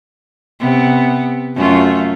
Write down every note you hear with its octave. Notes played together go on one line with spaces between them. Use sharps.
C3 B3
F#2 A3 F4